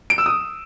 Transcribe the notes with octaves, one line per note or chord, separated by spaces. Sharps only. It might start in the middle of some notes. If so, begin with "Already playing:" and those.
D7
E6
D#6